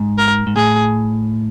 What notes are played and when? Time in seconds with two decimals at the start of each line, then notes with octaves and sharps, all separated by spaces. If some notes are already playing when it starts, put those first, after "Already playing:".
Already playing: G#2
0.18 A#4
0.47 G#2
0.56 A2 G#4